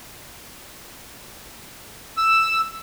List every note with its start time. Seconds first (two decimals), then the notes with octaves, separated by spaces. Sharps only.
2.17 E6